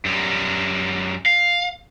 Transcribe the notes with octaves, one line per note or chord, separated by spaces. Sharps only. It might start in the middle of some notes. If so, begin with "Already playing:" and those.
F#2 G3
F5